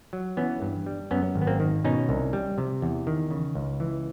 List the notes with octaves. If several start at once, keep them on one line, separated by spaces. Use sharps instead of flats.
F#3
E3 B3 C#4
G2
G3
F#2 B3 C#4
G#1
B3
A#3 C4
D#3
B2 C#4 D#4
C2
G3
C3
E2
D#3
C#3
C#2
E3